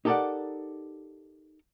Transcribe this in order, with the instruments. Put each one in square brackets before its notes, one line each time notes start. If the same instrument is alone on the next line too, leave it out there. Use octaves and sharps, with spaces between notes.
[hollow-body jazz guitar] D#4 G4 A4 A#4 D5 F#5